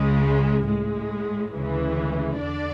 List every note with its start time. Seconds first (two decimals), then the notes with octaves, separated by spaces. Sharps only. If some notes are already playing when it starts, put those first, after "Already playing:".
Already playing: C#2 C#3 G#3
0.66 A2 G#3
1.54 D2 C#3 E3 G#3
2.40 E2 D3 D4 D5